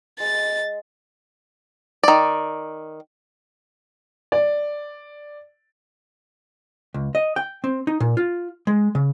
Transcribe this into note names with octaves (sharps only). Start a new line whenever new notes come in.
G#3 A6
D#3 D5
D5
C#2
D#5
G5
C4
D#4
A#2
F4
G#3
C#3